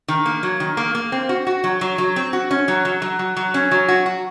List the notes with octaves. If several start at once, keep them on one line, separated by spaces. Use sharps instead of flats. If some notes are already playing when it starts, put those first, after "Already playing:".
D#3
A#3
F#3
D#3
A#3
A#3
C4
F#4
F#4
F#3
F#3
F#3
C4
F#4
C#4
F#3
F#3
F#3
F#3
F#3
C#4
F#3
F#4
F#4